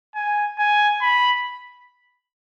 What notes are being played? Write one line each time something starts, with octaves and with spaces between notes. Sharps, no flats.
G#5
G#5
B5